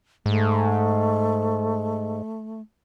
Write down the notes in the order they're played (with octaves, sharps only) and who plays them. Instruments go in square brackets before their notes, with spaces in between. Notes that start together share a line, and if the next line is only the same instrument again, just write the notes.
[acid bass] G#2 [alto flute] A3